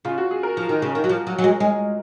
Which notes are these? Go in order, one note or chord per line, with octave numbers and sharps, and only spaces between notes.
C#3 F4
F#4
G#4
A#4
F3
D#3
C#3
D#3
F#3
F3
F#3
F#3
G#3
G#3